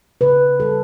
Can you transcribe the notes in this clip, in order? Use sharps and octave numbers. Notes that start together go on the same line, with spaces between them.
C#3 B4
G3 A4